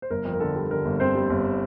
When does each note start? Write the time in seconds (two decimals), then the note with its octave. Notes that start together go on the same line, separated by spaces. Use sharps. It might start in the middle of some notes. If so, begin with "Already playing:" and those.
0.02 C5
0.10 G1 A#4
0.25 F2
0.33 A#4
0.40 D3 A4
0.56 G3
0.71 D3 A#4
0.85 G1
1.00 G1 C4 C5
1.15 G3
1.30 G1